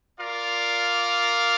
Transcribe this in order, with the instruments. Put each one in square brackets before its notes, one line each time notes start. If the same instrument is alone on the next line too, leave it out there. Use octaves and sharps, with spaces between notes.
[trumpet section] F4 A#4 D5 F5